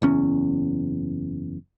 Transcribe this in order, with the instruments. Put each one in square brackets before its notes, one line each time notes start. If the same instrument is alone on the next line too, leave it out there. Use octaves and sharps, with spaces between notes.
[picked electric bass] F#1 E2 C#4